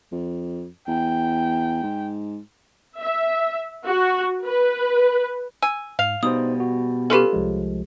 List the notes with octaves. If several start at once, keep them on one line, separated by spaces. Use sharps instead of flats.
F2
E2 G5
G#2
E5
F#4
B4
G#5 E6
G#2 F5
B2 G3 D#4 C5 D#6
F#4
C#4 F4 G4 A4 B4
C2 F3 G#3